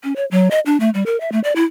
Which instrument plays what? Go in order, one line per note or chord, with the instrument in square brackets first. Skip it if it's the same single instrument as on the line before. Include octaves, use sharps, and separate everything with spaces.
[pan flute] C#4
C#5
F#3
D#5
D4
A3
G3
A#4
E5
A3
D5
E4